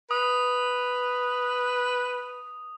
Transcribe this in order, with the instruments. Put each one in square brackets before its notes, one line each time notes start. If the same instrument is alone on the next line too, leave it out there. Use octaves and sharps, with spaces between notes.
[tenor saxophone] B4 [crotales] D#6